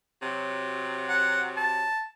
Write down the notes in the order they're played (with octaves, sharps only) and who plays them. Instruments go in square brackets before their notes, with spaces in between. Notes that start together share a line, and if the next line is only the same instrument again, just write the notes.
[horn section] C3 F#3
[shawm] F#5
A5